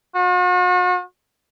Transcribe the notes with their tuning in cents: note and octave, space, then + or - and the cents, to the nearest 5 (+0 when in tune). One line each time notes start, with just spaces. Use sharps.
F#4 -45